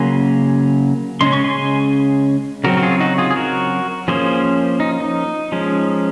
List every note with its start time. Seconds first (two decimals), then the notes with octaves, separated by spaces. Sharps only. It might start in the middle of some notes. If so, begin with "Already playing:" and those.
Already playing: C#3 F#3 A#3 G#5 C6
1.21 C#3 G#3 C#4 C6
1.33 C#6
1.44 G#5 C6
2.64 C#3 F#3 C4 F#4 A#4
2.77 F#4
2.83 F4 G#4
3.00 D#4 F#4
3.18 F4 G#4
3.31 G#4
3.36 F#4 A#4
4.08 F3 A#3 C#4 G#4 C5
4.80 D#4
5.00 D#4
5.52 F3 G#3 C#4